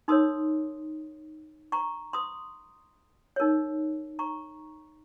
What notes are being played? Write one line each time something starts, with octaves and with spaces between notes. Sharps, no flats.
D#4 A#4 C#5 C6 D#6
A#5 C#6
C6 D#6
D#4 A#4 C#5
A#5 C#6